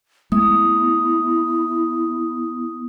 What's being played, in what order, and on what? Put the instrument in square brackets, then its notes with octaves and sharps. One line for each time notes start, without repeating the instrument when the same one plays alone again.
[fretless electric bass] G#3 A3 [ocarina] B3 [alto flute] E4 [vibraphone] D#6